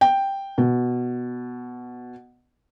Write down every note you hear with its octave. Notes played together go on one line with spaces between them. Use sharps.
G5
B2